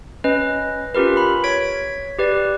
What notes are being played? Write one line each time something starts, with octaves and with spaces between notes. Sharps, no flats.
C#4 B4 D#5
C#4 F4 G4 A#4 B4
B5
C#5 G#6 B6 D7
G4 B4 D5